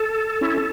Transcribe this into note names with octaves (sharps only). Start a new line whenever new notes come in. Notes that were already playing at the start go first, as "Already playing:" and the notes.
Already playing: A4
C#4 E4